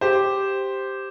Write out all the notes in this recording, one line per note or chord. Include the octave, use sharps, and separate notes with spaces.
G4 C5